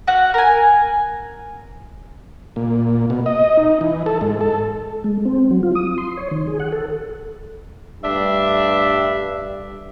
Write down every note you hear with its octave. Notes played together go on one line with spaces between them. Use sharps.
F#4 F5 F#5
A#4 G#5
A#2
B2
D#5
D#4
E3
A4
G#2
A4
G#3
C4
F#3
F4
D#6
C6
C#5
D#3
G#4
F#5
A4
G2 A3 D4 E5